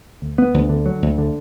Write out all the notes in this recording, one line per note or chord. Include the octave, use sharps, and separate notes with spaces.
D2
B3
D2
D3
F#3
D2
D3